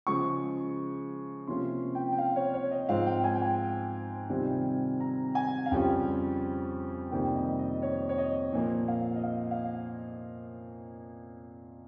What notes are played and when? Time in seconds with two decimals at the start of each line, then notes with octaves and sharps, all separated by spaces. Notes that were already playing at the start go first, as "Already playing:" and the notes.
0.07 C#3 F3 G#3 C#6
1.47 C3 F3 A#3 C#4 F4 C6
1.95 G5
2.12 G5
2.18 F5
2.36 C#5
2.54 C#5
2.71 D#5
2.89 G#2 F3 C4 F4 F5
3.06 G5
3.24 G#5
3.34 G5
3.42 G#5
4.29 C3 D#3 G3 C4 F4
5.00 A#5
5.35 G#5
5.66 F5
5.71 F2 C#3 G3 C#4 F4 G5
7.12 F2 C3 D#3 G3 A#3 G5
7.36 D#5
7.59 D#5
7.82 C#5
8.09 C#5
8.18 D#5
8.53 A#2 F3 A#3
8.88 F5
9.16 D#5
9.23 F5
9.51 F5